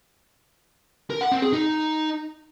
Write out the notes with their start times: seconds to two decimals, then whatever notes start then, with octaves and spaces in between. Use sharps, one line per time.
1.10 A#4
1.21 F#5
1.32 C4
1.42 G#4
1.53 D#4